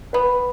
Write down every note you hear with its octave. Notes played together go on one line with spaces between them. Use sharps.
B3 B4